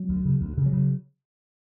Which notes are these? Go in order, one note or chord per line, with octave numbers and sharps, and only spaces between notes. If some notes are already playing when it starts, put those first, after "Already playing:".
Already playing: F#3
D2
C#3
D2
C#3
F#3
C#3